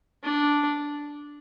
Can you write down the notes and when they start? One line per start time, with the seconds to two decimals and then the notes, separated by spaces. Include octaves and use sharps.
0.24 D4